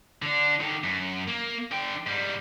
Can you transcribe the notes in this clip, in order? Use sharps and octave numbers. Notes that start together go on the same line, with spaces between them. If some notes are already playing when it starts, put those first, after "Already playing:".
D3 D4
D3 D#3
F#2
A#3
D3 G5
G#2 G3